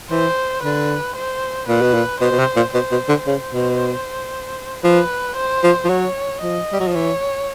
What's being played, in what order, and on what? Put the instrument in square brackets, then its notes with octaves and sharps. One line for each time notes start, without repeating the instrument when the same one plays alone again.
[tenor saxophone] E3 [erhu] C5
[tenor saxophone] D3 [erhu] B4
[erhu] C5
[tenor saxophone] A#2 [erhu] B4
[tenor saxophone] B2
A#2
[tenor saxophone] B2 [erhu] C5
[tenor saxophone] B2
C3
A#2
[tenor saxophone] B2 [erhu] C5
[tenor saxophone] B2
D3
[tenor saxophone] C#3 [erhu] C5
[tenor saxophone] B2
[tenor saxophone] F3 [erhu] B4
[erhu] C5
[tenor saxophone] F3
F3
[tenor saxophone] F#3 [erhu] C#5
[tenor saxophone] F3 [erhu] D#5
[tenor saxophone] G3
F#3
F3
[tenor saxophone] E3 [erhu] C#5